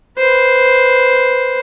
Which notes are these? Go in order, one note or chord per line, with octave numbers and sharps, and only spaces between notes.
B4 C5